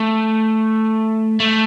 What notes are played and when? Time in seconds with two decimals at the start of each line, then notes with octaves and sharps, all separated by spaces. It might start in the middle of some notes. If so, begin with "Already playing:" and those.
Already playing: A3
1.40 A3